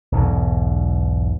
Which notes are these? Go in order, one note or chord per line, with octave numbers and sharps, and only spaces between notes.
B1 E2 G#2 B2